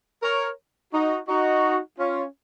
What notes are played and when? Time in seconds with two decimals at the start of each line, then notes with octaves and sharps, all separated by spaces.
0.23 A#4 C#5
0.93 D#4 F#4
1.28 D#4 F#4
1.99 C#4 F4